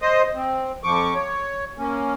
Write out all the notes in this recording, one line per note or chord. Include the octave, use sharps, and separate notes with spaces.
C5 D#5 D#6
C4
F2 F3 C#6 D6
C#5
A#3 C#4